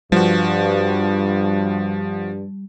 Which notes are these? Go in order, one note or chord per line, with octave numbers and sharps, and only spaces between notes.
G2 F3 G3 F#4